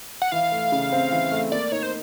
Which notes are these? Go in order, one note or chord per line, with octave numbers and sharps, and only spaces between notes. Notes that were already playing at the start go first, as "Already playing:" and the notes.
F#5
E3 F5
A3
C#3
C4
E3
A3
A#3 D5
D#4 C#5
C5